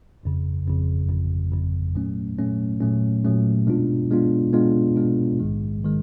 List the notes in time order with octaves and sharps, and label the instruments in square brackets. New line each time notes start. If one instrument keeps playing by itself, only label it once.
[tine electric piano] G1 F2 C#3
G1 F2 C#3
G1 F2 C#3
G1 F2 C#3
A#2 F#3 A3 C#4
A#2 F#3 A3 C#4
A#2 F#3 A3 C#4
A#2 F#3 A3 C#4
B2 G#3 B3 D4 F4
B2 G#3 B3 D4 F4
B2 G#3 B3 D4 F4
B2 G#3 B3 D4 F4
A#1 G#2 D#3 G#3
D#3 G#3